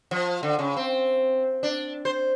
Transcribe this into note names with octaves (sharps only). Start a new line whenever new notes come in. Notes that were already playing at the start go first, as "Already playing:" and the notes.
F3
D3
C#3
C4
D4
C5